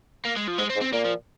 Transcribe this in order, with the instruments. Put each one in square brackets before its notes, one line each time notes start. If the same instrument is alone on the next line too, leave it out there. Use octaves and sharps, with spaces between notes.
[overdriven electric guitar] A#3
G#3
F3
[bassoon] G#2 [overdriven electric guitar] G#3
[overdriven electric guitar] C4
[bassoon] G#2
[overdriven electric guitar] C4
[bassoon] A#2 [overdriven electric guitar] A#3
[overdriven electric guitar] F3